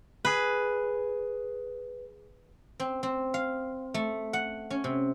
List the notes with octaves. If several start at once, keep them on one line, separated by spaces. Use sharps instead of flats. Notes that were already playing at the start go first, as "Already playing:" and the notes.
G#4 B4
C4
C4
F5
A3
F#5
C#4
C3